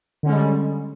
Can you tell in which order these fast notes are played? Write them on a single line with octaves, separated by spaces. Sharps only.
D3 C#4 G#3 G3